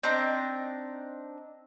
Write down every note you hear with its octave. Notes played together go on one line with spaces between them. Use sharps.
C4 D4 D#4 A#5